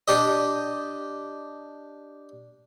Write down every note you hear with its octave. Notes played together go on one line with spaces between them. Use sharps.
D4 G4 D#5